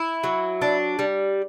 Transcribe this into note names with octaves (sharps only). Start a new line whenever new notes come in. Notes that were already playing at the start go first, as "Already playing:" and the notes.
Already playing: E4
F#3
D4
G3